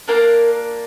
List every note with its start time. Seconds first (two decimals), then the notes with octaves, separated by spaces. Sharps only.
0.08 A#3 D4 F4 A#4